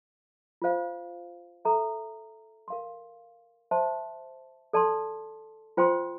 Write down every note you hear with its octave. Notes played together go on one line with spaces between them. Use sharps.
F4 C5 F5
A4 E5 A#5
A#4 F5 C6
C5 E5 A5 C6
A4 D5 A5 C6
F4 C5 G5 C6